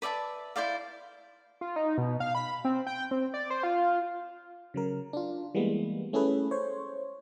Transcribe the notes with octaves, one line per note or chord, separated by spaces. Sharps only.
B4 D5 E5 A5
E4 C5 D5 F5
F4
D#4
B2
F5
B5
C4
G5
C4
D5
C5
F4
C#3 F#3 A#4
D4 F4
E3 G3 G#3 A#3 B3
A3 C#4 E4 G#4 A4 B4
C5 C#5